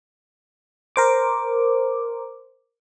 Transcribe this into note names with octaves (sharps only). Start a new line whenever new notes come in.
A#4 C5 D6